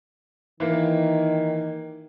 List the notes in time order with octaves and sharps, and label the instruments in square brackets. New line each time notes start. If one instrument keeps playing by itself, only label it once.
[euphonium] D#3 [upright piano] E3 A#3